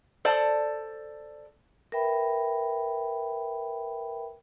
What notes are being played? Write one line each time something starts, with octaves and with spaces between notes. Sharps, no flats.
A4 C5 D5 A5
A#4 B4 E5 G5 B5